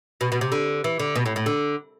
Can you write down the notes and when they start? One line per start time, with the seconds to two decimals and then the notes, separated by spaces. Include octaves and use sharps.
0.21 B2
0.32 B2
0.41 C3
0.52 D3
0.84 E3
1.00 D3
1.15 B2
1.26 A2
1.36 A2
1.46 D3